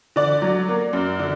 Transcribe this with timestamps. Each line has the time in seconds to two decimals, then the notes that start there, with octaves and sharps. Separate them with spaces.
0.16 D3 D5
0.42 F#3
0.68 A#3
0.93 F#2
1.19 D3